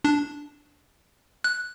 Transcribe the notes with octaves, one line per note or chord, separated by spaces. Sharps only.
D4
F#6